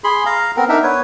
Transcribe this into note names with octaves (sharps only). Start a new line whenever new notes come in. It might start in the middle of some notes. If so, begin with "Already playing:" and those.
G#4 B5 C6
F5 A#5
B3 C4 A#4
D4 D#4 A#4 E5
B3 B4 C#5